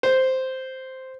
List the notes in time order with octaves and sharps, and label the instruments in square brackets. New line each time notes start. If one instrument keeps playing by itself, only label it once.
[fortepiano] C5